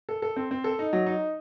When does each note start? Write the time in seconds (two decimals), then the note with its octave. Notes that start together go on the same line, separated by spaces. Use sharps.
0.09 A4
0.22 A4
0.36 C4
0.51 C4
0.64 A4
0.79 D#4
0.93 F#3
1.07 D#4